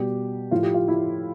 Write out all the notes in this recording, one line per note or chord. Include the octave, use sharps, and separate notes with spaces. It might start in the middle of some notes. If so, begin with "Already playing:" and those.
Already playing: B2 G3 G4
A2 F3 F4
G4
F4
E4